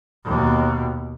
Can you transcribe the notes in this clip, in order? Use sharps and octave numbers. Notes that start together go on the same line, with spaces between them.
D#2 B2